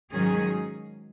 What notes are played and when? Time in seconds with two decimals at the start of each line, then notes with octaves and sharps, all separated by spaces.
0.11 G#2 D#3 F#3 C#4 G#4